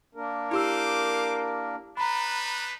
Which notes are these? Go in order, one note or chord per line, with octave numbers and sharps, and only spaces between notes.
A#3 D4 A#4
E4 G4 C5 F5 D6 E6
D4 D#4 B4 A#5 B5